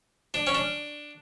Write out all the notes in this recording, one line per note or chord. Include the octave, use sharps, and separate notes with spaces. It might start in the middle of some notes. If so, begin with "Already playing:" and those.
D4
C#4
D4